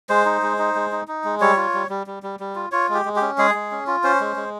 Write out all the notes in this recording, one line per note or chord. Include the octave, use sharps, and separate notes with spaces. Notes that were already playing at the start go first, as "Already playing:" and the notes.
G#3 C5
D#4
G#3
D#4
G#3
D#4
D#4
G#3
G3 C#5
F4
G3
G3
G3
G3
G3
F4
F4 C#5
G#3 G4
G#3
G4
C#4
G#3 G#4
G#3
C#4
F4
C#4 C5
G#3
G#3